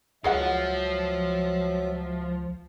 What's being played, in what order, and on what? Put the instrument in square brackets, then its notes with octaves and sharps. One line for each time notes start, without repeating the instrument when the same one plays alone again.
[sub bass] C#2 [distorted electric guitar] F3 [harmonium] F#3 E5 [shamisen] G#4 D#5 F#5